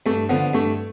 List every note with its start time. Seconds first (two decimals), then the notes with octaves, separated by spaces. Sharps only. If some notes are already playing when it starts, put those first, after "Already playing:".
0.06 G2 A3
0.29 D3 F3 B3
0.54 G2 A3